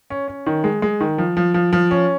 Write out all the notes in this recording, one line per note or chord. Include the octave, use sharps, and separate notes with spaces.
C#4
C#4
D#3
G#3
G#3
D#3
F3
F3
F3
F3
C#4